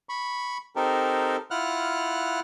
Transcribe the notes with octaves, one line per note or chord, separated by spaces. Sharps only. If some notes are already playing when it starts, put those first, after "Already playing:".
B5 C#6
C4 D#4 G4 A4 A#4
E4 F4 F#5 F6 F#6